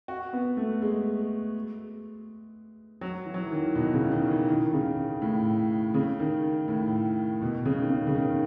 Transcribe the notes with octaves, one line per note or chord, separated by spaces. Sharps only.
F#4
B3
A3
G#3
F#3
E3
F#3
E3
D#3
B2
C#3
D#3
E3
D#3
C#3
A2
C#3
D#3
A2
B2
C#3
D#3
C#3
C#3
D#3